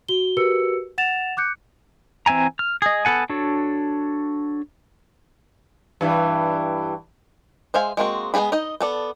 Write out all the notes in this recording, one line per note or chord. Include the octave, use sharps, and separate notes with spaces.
F#4 G7
F#4 G4 A#4 B4 E6 C#7
F#5 A6 E7 F7
D6 F#6 G6 C#7
E3 C4 E5 G#5 A#5
F6
G#4 D#5
B3 A4 F#5 G#5
D4 F#4 A4 C#5
G2 E3 G3
G#3 C5 E5 F5 G#5
G#3 A#3 C4 F#4
G#3 B3 C#4 G#4 B5
D#4 D#5
B3 A4 D5